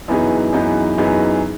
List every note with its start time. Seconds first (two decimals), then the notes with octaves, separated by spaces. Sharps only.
0.08 F#2 E3 B3 D#4 G#4
0.52 F#2 E3 B3 D#4 G#4
0.98 F#2 E3 B3 D#4 G#4